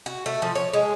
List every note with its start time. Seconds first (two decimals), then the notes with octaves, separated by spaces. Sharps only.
0.06 F#4
0.26 A3
0.42 F3
0.55 C#5
0.73 G#3